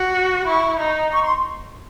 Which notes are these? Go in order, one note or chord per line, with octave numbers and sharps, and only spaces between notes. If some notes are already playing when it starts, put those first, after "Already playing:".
Already playing: F#4
E4 C#6
D#4
C#6
C6